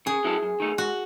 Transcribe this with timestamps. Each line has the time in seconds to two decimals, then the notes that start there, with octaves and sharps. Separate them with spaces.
0.06 C#3 G#4
0.24 F#3 C#4 E4 A4
0.43 F#2
0.60 D#3 A3 D#4
0.78 G#2 F#4